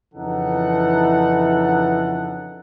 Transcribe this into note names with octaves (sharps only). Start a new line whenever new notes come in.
F2 C#3 E3 D#4 A4 F#5